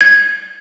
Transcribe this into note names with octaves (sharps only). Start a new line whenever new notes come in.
G#6